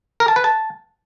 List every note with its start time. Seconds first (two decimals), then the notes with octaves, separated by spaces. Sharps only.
0.20 A#4
0.28 A5
0.36 B4
0.44 A5